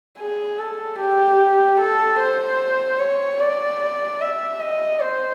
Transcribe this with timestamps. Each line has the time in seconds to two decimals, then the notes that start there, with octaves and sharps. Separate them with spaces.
0.18 G#4
0.58 A4
0.98 G4
1.80 A4
2.19 C5
2.99 C#5
3.40 D5
4.20 E5
4.60 D#5
5.00 C5